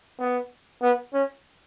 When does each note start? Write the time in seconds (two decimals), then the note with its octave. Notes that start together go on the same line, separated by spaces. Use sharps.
0.19 B3
0.82 B3
1.13 C#4